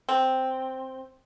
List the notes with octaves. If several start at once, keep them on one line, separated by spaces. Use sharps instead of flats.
C4